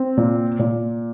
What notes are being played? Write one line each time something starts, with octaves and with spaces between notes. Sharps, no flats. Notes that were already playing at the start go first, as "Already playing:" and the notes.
Already playing: C4
A#2
A#2